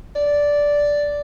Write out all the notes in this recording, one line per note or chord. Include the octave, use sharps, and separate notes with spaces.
D5